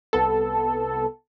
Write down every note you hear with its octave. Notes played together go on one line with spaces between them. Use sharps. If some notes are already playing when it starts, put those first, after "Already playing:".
C2 B3 A4